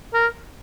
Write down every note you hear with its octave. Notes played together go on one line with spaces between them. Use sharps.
A#4